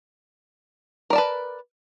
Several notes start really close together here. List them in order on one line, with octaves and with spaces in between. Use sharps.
A#4 D5 A5 B4